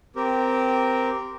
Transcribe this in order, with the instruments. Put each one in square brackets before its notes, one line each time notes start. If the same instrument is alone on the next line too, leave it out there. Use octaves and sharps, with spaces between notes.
[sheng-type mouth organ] C4 G4 A#4